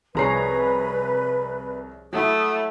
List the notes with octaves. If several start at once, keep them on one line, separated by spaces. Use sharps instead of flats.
C2 F3 G#4 B4 C#5 A#5 C7
F#3 A3 E4 D#6